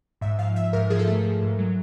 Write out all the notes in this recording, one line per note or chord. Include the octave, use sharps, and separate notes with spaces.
G#2 E5
F3 F5
F3 E5
G#2 A#4
F3 G#4
A4
A3 G#4
F3
G#2
F#3